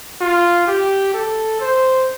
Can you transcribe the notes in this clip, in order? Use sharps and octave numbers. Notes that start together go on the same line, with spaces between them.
F4
G4
A4
C5